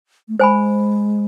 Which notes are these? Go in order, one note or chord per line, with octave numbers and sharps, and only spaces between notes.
A3
G#3 C5 G#5 B5